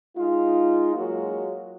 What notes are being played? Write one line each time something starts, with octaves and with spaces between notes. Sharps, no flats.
G#3 D#4 F4
F#3 G#3 A#3 F4 F#4